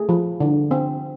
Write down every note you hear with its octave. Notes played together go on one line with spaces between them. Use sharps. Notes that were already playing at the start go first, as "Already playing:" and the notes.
Already playing: A3 G#4
F3
D3
C4